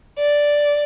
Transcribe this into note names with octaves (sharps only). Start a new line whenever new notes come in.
D5